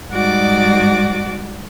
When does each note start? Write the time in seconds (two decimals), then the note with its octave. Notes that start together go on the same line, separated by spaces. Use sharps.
0.11 G#2 G3 F#4 D5 D6